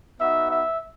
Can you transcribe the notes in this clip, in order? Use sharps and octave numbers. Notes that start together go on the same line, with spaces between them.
B3 D#4 F#4 E5
E5